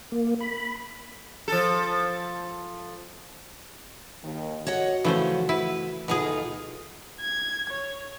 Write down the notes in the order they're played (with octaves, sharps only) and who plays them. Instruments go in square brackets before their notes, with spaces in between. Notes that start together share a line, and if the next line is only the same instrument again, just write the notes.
[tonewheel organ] A#3
B5
[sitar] F3 A4
[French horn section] D#2 D#3
[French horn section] F#4 [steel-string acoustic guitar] C#5 D#5 F#5
[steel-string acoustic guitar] C#3 F3 C#4 [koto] E3 A3 C5
[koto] E4 [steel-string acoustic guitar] B4
[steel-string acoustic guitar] D2 D#4 F4 [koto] B2 G#4
[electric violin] G#6
C#5